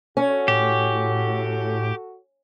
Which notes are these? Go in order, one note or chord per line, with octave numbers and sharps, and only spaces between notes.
C#4 F#4 A4
A2 G4